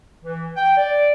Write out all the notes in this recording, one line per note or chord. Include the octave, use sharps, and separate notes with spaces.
E3
G5
D5